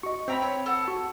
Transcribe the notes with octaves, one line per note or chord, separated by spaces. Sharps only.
F#4 D#5 C#6
C4 E5 G5 A#5 B5 G6
C#5
A4 F#5 A5
F#4